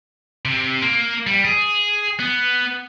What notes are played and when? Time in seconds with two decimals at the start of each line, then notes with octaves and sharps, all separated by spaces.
0.45 C3
0.82 A#3
1.27 G3
1.45 G#4
2.20 B3